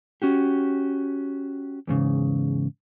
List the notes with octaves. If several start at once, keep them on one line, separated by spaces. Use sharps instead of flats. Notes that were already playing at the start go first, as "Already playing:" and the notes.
C#4 F#4 G4
E2 G#2 C#3